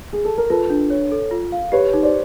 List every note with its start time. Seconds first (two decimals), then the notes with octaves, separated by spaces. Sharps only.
0.13 G#4
0.25 A4
0.38 A#4
0.50 F4 A4 B4
0.70 D4
0.90 C#5
1.12 A4
1.31 F4
1.52 F5
1.72 G4 B4 C#5
1.94 D#4
2.03 C5 D5